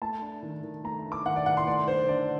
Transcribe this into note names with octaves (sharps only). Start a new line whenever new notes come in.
A3 A5
D4
D#3
D#3
A3 A#5
D4
D6
D#3 F#5
D5
D#3 F#5
C6
A3 D5
D4 C5
D3 D5